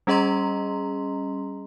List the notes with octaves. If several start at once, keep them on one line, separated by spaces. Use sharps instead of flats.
G3 C#4 G#4 D#5 A#5 C6